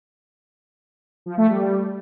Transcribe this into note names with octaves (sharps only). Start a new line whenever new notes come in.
F3
A3
G3
G3